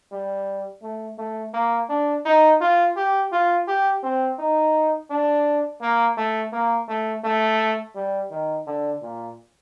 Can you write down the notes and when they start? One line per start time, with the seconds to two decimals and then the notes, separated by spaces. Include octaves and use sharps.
0.12 G3
0.83 A3
1.18 A3
1.54 A#3
1.89 D4
2.25 D#4
2.61 F4
2.96 G4
3.32 F4
3.68 G4
4.03 C4
4.39 D#4
5.10 D4
5.81 A#3
6.17 A3
6.52 A#3
6.88 A3
7.23 A3
7.95 G3
8.30 D#3
8.66 D3
9.02 A#2